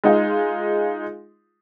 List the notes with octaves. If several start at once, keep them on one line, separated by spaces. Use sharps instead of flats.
G#3 D#4 F4